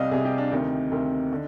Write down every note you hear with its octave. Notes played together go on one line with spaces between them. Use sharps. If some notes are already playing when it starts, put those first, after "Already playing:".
Already playing: C2 C3 G3 D5 D#5 F5
C2 C3 G3 G#4
G4
D4
D2 C3 D#3 D#4
D2 C3 D#3
D3